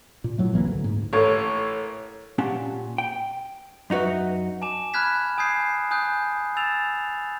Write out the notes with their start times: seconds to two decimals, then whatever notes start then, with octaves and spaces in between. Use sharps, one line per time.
0.24 A#2
0.38 A2 F#3 A3
0.52 C2 E3 F#3 A#3
0.67 D2
0.84 G#2
1.13 A1 A2 A4 A#4 C#5
2.38 A#2 C#4 G4 F#5 A5
2.98 G5
3.90 F#2 D#4 F#4 B4 E5
4.62 G#5 A5 D6 E7
4.93 B5 F6 F#6 G#6 B6 E7
5.38 G#5 D#6 G6 G#6 C7
5.91 G#5 D#6 F#6 G6
6.57 G#5 E6 A6 E7 F7